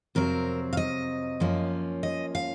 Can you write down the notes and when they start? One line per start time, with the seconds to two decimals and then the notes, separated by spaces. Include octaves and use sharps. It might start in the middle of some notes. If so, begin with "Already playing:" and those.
0.15 F2 C3 F#3 C4 A#4
0.73 F5
0.77 D#5
1.40 F#2 F3 A#3 C#4
2.03 D#5
2.35 F5